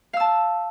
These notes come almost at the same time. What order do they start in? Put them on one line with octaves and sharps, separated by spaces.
F5 E6 A5